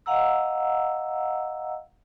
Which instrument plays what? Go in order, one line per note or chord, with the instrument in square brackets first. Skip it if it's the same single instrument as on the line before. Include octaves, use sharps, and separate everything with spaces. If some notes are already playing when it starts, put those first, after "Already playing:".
[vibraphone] D#5 F5 F#5 A#5 E6